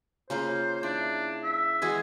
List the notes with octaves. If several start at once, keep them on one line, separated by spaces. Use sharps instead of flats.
C#3 A#3 F4 C5
D4 E4
E5
E3 G#3 F#4 G#4